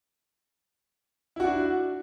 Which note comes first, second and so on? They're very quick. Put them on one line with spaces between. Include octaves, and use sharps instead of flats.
E4 F#4 D4